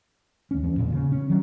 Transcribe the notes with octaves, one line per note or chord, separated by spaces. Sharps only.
D#2 C#4
E2
E1 A#2
C#3
C#4
D#3 F#3 G3